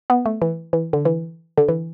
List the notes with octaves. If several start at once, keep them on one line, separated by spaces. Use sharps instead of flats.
B3
A3
E3
E3
D3
E3
D3
E3